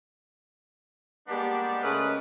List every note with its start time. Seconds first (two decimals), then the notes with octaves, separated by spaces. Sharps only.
1.28 G3 G#3 A#3 B3 D4 G4
1.82 C#3 G#3 A3 A#4 B4